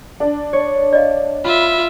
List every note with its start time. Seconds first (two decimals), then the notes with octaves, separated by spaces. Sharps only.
0.20 D4
0.53 C#5
0.93 D5 D#5 F5
1.45 F4 E5 B5